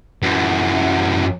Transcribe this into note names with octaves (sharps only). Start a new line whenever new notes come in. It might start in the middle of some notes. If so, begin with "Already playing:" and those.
F#2 E3